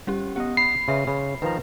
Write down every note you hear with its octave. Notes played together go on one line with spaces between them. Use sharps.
G3 C#4 G4
B3 G4 D#5 F#5
B5 C7
C#3 B4 E5 C6
C#3 B5
D#3 F3 B4 A#5